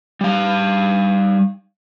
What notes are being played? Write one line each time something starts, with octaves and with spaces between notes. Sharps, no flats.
G3 F5